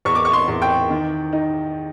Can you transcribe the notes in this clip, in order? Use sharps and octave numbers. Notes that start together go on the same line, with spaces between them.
E2 C#6
D6
C#6
C6
E2
G5
D#3
D#4